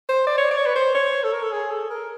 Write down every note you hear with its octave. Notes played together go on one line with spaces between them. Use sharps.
C5
D5
C#5
D5
C#5
B4
C5
C#5
A4
A#4
A4
G#4
A4
A#4